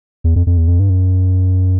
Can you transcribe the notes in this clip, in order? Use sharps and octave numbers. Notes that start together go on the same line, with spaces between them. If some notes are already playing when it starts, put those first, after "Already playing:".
E2
F2
F2
E2
F2
G2
F#2